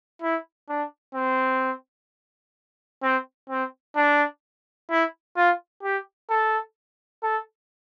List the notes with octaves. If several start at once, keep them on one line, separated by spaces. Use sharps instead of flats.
E4
D4
C4
C4
C4
D4
E4
F4
G4
A4
A4